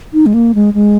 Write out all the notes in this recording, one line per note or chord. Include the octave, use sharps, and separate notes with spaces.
D#4
G#3
A#3
G#3
G#3